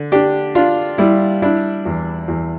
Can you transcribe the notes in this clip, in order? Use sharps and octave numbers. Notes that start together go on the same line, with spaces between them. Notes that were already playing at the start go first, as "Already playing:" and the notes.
Already playing: D3
D4 G4
D4 F4
G3 E4
D4 E4
E2
E2